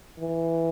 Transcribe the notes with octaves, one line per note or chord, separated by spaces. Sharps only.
E3